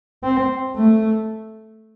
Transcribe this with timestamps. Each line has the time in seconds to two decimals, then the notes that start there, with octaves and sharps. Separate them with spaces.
0.24 C4
0.76 A3